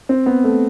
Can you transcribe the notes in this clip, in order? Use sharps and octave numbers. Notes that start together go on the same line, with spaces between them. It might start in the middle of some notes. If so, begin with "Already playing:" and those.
C4
B3
A3